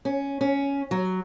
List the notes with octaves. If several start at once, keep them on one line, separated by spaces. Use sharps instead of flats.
C#4
C#4
F#3